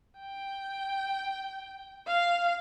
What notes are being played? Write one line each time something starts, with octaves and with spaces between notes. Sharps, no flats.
G5
F5